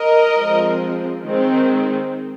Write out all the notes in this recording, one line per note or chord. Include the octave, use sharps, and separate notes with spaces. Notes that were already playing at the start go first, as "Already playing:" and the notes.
Already playing: A#4 D#5
F3 G#3 C4
D#3 G#3 C4